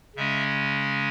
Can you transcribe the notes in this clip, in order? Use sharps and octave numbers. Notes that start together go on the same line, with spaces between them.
C#3 G#3 C#4 E5